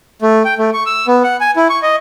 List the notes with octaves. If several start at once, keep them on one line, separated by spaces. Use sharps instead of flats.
A3
G5
A3
C#6
E6
B3
F#5
G#5
E4
C#6
D#5